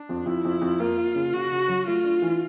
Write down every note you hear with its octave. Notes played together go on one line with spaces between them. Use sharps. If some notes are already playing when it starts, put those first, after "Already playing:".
Already playing: D4
F2
F2 E4
F2
F2
A#3 F4
A#3
C#3
C#3 F#4
C#3
F#3
A3 F4
D4
E3